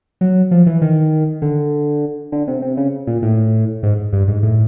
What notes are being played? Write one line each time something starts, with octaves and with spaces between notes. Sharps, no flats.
F#3
F3
E3
D#3
D3
D3
C3
C3
C#3
A#2
A2
G#2
G2
G#2
A2